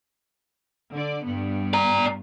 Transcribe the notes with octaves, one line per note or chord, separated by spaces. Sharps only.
D3 D5
G2 B3
D5 A#5